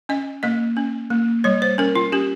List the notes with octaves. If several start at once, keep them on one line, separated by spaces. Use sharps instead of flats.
C#4 D#5
A#3 D#5
C#4
A#3
G3 C#5
C5
C#4 A#4
F4
C#4 G4